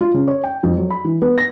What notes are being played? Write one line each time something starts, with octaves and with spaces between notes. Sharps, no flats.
F4
C#3
C#5
G5
F2
F#3
B5
E3
B3
A#6